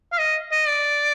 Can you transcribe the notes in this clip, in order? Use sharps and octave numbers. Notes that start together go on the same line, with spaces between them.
F5
D#5
D#5
D5